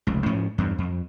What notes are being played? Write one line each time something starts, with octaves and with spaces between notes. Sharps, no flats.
F1 C#2
G#2 F3 C#4
E2 G2
F2